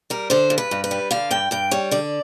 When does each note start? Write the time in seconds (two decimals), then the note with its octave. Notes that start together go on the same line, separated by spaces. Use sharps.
0.10 G3 A#4
0.30 D3 C5
0.50 G2
0.58 B4
0.71 G2
0.84 B4
0.91 G3
1.11 D3 F5
1.31 G2 G5
1.51 G2 G5
1.71 G3 C#5
1.91 D3 D5